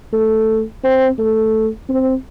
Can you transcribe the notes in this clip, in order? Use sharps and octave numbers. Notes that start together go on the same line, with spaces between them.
A3
C4
A3
C4